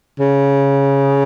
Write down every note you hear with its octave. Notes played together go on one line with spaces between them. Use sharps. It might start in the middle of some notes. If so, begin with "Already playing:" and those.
C#3